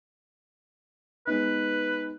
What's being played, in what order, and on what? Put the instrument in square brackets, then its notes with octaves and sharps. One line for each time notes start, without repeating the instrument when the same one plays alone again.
[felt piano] G#3 B3 D#4 [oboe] B4